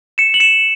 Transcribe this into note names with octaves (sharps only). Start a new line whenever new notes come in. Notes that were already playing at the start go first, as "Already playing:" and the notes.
C#7 E7
F#7
C#7 E7